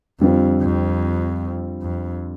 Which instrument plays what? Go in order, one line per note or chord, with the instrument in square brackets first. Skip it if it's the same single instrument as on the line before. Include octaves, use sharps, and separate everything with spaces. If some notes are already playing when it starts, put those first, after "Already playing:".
[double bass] F2 [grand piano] D3 G3 C4 F4
[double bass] F2
F2